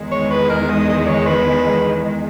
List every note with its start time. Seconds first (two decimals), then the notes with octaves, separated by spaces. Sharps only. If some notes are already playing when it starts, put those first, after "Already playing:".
Already playing: E2 D#3 G#3
0.12 C#5
0.31 B4
0.50 A#4
0.69 D#5
0.89 D#5
1.07 C#5
1.27 B4